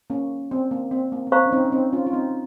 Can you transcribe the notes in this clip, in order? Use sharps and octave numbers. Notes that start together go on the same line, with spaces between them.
A#3 C#4
C4
A#3
C4
A#3
A#3
C4 C5 F5 A#5 C#6
C#4
C4 D#4
C#4
C4 D#4
C#4 F4
F4
C4 D#4